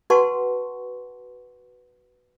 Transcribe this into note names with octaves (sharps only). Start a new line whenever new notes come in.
F#4 B4 F#5 A5 C6 C#6